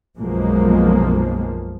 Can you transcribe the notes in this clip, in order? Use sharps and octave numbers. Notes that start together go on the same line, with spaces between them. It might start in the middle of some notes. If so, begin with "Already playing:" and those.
B1 F#2 B2 F3 G#3 A#3